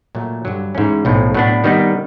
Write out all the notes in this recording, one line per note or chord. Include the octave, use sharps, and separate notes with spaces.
A#2 F#3 A3
G2 D3 F#3
G#2 E3 A3 C#4
B1 A2 F3
A2 F#3 B3 D4
D#3 G3 B3 D#4